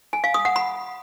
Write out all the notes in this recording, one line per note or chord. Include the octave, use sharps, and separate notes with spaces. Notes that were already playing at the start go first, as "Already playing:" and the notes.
G#5
F5
D#6
F#5
B5